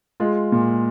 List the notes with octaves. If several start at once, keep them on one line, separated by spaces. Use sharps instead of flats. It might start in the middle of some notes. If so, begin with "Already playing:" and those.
G#3 F4
A#2